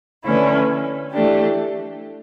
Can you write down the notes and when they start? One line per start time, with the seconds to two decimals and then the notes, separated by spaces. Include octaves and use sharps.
0.24 D3 A3 C#4 E4 B4
1.11 E3 A3 D4 G4